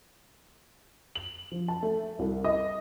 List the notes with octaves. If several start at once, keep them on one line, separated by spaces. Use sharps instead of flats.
F#7
F3
A5
A3
C2
D#5